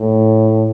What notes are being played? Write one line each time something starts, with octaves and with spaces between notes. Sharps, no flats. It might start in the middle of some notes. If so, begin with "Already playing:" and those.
Already playing: A2